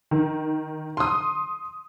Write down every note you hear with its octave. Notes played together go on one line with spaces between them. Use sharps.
D3 D#3
C6 D#6